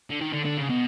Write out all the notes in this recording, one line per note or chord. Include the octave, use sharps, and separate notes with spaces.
D3
D#3
D3
D3
C#3
B2